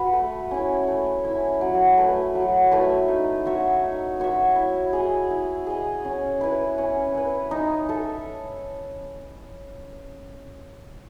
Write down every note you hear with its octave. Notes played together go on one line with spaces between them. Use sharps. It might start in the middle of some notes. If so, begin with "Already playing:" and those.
Already playing: F#4 B4
A3
C#4 E4
A3
C#4 E4
F#3
A3 E4 B4
F#3
A3 E4 B4
D#4
F#4 C#5 E5
D#4
F#4 C#5 E5
E4
G#4 D#5
E4
G#4 D#5
C#4
E4 B4
C#4
E4 B4
D#4
A4 E5